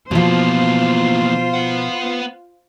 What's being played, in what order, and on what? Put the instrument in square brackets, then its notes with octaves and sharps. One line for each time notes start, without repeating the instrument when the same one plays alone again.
[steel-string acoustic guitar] B2 F3 [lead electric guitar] E3 A#3 [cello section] F4 C5
[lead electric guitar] B3 F#5